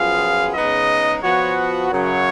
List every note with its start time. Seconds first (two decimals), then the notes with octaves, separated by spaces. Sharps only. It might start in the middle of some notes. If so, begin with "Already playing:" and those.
Already playing: F#2 F3 B3 F4 G#4 F5
0.55 C#3 G#3 B3 D#4 D#5
1.23 F3 B3 F#4 C#5
1.91 F#2 C#3 F#3 C#5